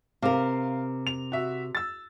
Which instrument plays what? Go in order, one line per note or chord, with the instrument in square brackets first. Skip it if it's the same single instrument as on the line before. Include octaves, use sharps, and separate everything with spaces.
[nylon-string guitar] C3 A#4 [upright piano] F5 D6
[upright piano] F7
F#4 E5
E6 A6